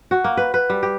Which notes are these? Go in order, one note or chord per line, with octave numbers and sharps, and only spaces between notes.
F#4
A#3
B4
B4
G3
G4